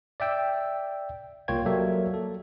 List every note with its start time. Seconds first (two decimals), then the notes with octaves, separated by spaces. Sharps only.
0.20 D5 E5 G5 E6
1.48 C2 A#3 F4 C#5 G5 G#6
1.65 F#3 G3 A#3 A4 E5
2.14 A4